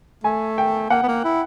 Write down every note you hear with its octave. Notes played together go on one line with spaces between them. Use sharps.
A3 G#5
G5
A#3 F#5
B3
A#3
E4